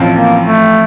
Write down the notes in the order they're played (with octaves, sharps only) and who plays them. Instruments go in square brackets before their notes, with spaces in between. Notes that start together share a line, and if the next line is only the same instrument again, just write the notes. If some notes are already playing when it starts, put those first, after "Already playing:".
Already playing: [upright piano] A1 A2 F3 C4 F4
[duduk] A#3
A3